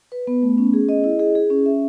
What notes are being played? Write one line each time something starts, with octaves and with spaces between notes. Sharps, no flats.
B4
B3
A3
C#4
G#4
D#5
E4
G#4
G#4
C#4
E5